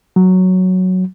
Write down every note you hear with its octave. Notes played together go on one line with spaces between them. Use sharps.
F#3